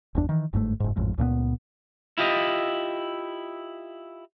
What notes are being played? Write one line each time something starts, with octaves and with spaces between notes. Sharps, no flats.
G1 E2 D4
D#3 E3
G1 G#2 C#3 A3
F#1 G#2
A1 F2 G#2
C#2 A#2 A3 B3
E4 F4 G4 D#5